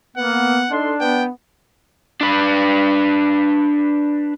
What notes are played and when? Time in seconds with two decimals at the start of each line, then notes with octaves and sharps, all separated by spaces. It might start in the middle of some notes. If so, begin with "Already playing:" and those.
0.17 A#3 B3 F#5
0.71 D4 D#4 A4 C6
1.00 B3 G5
2.21 D4 B4